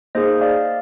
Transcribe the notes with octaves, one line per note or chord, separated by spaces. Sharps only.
A#3 D#4 G#4 C5 D#5
D5 F5